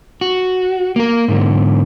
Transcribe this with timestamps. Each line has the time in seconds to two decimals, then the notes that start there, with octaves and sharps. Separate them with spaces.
0.21 F#4
0.96 A#3 A#4
1.28 G#2 D3